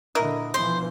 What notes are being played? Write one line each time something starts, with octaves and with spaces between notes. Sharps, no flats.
A#2 D3 E4 A#4 D#5
B2 E3 F3 C5